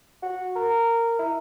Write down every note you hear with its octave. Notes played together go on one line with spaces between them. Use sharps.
F#4
A#4
E4